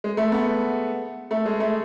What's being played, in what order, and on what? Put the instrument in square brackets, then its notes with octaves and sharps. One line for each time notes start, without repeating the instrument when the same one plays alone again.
[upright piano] G#3
A3
B3
A3
G#3
A3